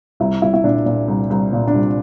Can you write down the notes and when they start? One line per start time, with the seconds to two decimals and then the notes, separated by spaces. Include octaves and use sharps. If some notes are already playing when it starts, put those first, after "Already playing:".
0.20 C2 E4
0.42 C2 E4
0.54 E4
0.64 A#2 D4
0.86 A#2
1.08 C2
1.30 C2
1.53 A#2
1.67 D4
1.74 C2